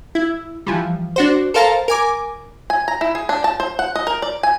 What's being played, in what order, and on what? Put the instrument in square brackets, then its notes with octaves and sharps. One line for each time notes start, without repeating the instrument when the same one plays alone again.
[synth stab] E4
E3 F3 G3
D4 F#4 C5
A4 A#4 C5 F5 A5 A#5
A#4 G#5 D6
[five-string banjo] G#5
A#5
E4
G#4
D4
A5
C5
F#5
D#5
A#4
D5
G#5